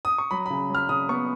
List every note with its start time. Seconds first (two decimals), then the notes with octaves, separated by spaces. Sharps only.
0.05 D#6
0.18 C#6
0.31 F#3 B5
0.46 B5
0.50 C#3
0.70 F#3 F6
0.89 C#3 D#6
1.09 B3 C#6